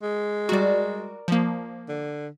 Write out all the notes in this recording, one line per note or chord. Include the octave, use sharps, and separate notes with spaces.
G#3
G3 F#4 A#4 D5
F3 A#3
D3